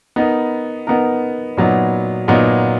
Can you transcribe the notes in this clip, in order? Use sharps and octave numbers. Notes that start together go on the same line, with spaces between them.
B3 D#4 A#4
B3 D#4 A#4
A#2 F#3 B3 D#4
A#2 F#3 B3 D#4